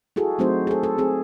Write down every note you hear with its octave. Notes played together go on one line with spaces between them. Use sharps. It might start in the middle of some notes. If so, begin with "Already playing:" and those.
E4 F#4 G#4 A4
F#3 A3 C4 D#4 F#4 C5
G#4 A4
A4
C4 G#4